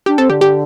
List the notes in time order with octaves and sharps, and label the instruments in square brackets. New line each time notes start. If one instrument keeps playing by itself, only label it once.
[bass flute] D4 [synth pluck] G4
[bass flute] C4 [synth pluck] A4
[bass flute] D3 [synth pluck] G4
[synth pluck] G4